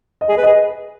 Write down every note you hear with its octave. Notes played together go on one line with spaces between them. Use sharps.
D#5
G#4
D#5
B4
D#5
G#4